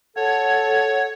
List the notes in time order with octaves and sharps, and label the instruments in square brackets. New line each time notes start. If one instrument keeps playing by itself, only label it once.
[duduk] A4 [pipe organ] C#5 [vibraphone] F#5